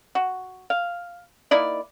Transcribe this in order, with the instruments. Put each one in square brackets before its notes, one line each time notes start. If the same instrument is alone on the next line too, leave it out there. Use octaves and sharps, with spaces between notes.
[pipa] F#4
F5
A#3 D#4 E4 D5